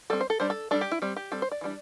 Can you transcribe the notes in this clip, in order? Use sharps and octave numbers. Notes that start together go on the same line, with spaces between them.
G3 C4 A4
C5
A4
G3 D4 C5
A4
G3 D4 A4
G4
E4
G3 C4
G4
G3 C4 A4
C5
D5
E3 G3 D4